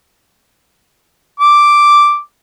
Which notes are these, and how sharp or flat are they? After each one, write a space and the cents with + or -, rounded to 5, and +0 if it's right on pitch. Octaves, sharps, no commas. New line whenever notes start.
D6 +0